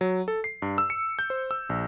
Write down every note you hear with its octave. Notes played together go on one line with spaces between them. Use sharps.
F#3
A4
C7
G2
E6
C#7
G6
C5
E6
A#1